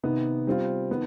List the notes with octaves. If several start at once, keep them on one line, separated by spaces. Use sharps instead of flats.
C3 D#3 B3 D#4
G3 C4 F4
D#3 B3